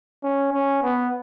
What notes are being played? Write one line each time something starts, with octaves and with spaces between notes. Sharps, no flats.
C#4
C#4
B3